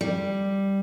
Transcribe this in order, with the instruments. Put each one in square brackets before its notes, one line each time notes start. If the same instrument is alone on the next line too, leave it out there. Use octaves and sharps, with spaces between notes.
[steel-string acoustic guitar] G3